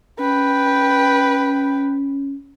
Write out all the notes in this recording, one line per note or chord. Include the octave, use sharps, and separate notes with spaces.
C#4 B4 G5